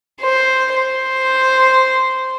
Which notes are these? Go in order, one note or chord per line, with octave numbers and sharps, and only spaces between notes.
C5
C5